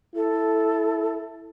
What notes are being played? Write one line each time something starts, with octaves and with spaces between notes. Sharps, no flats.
E4 A4